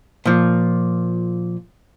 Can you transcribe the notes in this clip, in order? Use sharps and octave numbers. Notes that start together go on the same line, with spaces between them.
A#2 F3